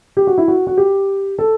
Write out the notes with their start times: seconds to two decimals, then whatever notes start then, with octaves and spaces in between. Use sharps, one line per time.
0.17 G4
0.27 F#4
0.38 E4
0.48 F#4
0.67 F#4
0.77 G4
1.39 A4